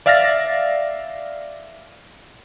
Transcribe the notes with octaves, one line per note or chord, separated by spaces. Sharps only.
D5 E5 F5 F6 A6 A#6